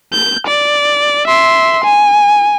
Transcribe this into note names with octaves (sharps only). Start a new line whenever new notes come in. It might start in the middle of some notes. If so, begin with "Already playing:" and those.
G6
D5
E5 C6
G#5